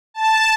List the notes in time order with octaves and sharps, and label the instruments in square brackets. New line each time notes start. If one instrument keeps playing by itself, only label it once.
[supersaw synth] A5